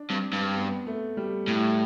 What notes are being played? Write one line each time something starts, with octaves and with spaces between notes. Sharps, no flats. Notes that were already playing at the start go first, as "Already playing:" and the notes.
Already playing: D4
G2 C4
G2
B3
A3
G3
A2 G3